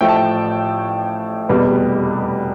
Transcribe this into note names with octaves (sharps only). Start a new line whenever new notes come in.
A1 A2 F3 A3 G5
A5
G5
F1 E2 B2 G3 B3